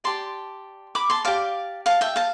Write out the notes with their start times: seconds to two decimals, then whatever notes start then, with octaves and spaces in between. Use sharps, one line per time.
0.04 G4 D5 A5 C6
0.95 B5 D6
1.10 A5 C6
1.25 G4 D5 F5 A5
1.86 F5 A5
2.01 E5 G5
2.16 F5 A5